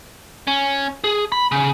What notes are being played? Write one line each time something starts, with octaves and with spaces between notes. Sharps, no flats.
C#4
G#4
B5
C#3